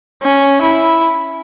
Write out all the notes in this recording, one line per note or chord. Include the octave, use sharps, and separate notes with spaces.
C#4
E4